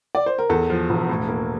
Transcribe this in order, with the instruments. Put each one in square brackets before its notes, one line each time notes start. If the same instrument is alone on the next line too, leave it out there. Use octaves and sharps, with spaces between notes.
[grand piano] D5
C5
A#4
[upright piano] E2 [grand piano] A4
[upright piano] F3
E1
A2
A#3